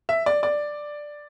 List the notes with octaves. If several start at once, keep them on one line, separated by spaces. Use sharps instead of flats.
E5
D5
D5